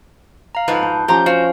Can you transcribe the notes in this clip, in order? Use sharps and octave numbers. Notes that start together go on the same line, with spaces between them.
F5 A#5
G#2 F3 B4
A5 G6
F3 C#4 G4 A#5 G6
F#4 C5 F5